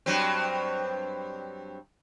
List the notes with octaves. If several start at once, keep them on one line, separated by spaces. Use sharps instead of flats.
G2 F#3 C4